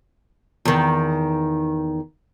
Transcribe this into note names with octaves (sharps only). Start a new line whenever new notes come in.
E2 D#3